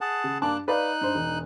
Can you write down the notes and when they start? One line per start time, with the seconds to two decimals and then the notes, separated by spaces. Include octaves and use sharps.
0.01 G#4 F#5 A5
0.24 C#3
0.42 G2 A#3 D4 A5 D6 F#6
0.68 D#4 B4 D5 F5 F#6
1.01 G2 C5
1.15 E1